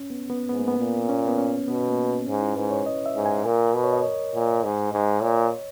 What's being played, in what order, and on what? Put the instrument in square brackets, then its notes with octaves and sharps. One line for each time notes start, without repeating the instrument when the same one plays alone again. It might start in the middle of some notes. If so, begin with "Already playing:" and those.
Already playing: [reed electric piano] C#4
B3
B3
[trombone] G#2 [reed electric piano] B3
[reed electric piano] A#3
B3
[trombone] A#2
[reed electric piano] C#4
B3
C#4
[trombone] B2 [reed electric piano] B3
[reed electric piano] A#3
B3
[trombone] G#2 [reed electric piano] C#4
[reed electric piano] E4
[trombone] G#2 [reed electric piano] B4
[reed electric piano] C#5
D#5
E5
[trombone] G#2
[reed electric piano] G#5
[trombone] A#2 [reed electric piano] A#4
[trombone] B2
[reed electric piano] C#5
D#5
C#5
[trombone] A#2
[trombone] G#2 [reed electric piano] D#5
[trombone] G#2
[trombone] A#2 [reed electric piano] C#5